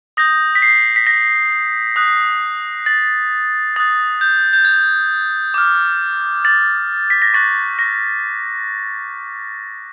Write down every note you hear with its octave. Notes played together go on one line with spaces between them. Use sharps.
D#6 G6 A#6
B6
C7
B6
A#6
D#6 F#6
A6
D#6 F#6 A6
G6
G6
G#6
D6 F6
A6
B6
A#6
C#6 F#6 A6
A#6